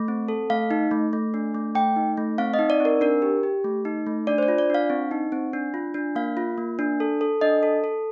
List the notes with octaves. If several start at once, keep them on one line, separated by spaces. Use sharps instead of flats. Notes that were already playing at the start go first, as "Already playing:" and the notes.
Already playing: A3
C4
A4
A3 F5
D#4
A3
A3
D4
A3
A3 G5
D#4
A3
C4 F5
D#5
D#4
D5
C4
A#4
D4 A#4
G4
G4
A3
D#4
A3
D4 D5
C5
D5
F4
D5
D4 F5
C4
D#4
C4
D4
F4
D4
A#3 F5
F4
A#3
D4
A4
A4
D4 D#5
A4
A4